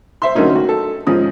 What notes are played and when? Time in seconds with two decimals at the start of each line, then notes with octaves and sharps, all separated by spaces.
0.22 C5 E5 C6
0.35 D3 F#3 A3 A#3 C#4 D#4
0.55 F#4
0.69 A4
1.07 G#2 F3 C#4 D#6